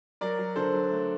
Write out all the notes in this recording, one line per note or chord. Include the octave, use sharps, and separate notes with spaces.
F#3 A#4 D5
F#3
D3 A4 C5
F#3
A3